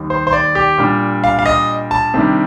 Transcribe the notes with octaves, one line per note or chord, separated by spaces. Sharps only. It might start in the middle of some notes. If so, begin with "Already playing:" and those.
Already playing: D#2 D#3 G3
C5
C5
D5
G4
A#2 G3 D4
F5
F5
D#5
A5
C3 D#3 G3 D4